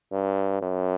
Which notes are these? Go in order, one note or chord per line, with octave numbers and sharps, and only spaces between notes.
G2
F#2